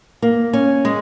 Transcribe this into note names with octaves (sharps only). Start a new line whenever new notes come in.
A#3
C#4
G#3